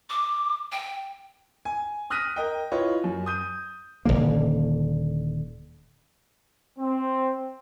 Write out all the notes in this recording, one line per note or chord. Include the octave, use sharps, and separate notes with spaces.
D6
G5
G#5
D#6 F6 F#6 A#6 B6 D#7
A#4 D#5 G5
E4 F4 B4 C#5 D#5
F#2
D#6 G6 D#7
D#1 G#1 D3 A#3
C4